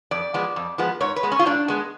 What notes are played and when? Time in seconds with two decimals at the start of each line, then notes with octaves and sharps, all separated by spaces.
0.11 F2 D5
0.34 F3 G#3 B3
0.56 F2
0.78 F3 G#3 B3
1.00 G#2 C#5
1.16 B4
1.23 G#3 B3
1.32 C#4
1.39 F4
1.46 G#2 D4
1.68 G#3 B3